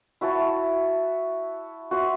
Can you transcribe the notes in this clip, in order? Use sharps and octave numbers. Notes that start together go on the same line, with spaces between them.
E4 F#4 C#5 A5
F#4 C5 E5